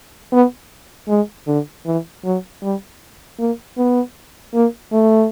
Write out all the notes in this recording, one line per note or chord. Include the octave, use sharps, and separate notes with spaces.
B3
G#3
D3
E3
F#3
G3
A#3
B3
A#3
A3